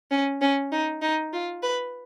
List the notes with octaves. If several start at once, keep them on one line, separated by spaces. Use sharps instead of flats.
C#4
C#4
D#4
D#4
F4
B4